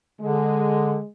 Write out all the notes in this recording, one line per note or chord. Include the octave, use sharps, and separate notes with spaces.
D3 G#3